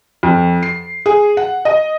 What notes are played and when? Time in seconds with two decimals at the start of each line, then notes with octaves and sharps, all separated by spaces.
0.23 F2
0.63 C7
1.06 G#4
1.37 F#5
1.65 D#5